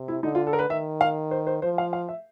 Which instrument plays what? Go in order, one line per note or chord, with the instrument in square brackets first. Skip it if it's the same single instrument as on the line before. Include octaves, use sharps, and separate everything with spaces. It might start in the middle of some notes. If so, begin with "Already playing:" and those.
Already playing: [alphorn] C3
[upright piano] E4
[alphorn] D3 [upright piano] D#4
[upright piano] F4
A4
A#4
B4
[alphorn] D#3 [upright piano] E5
[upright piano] F5
C5
C5
[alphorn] F3 [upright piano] C5
[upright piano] F5
F5
E5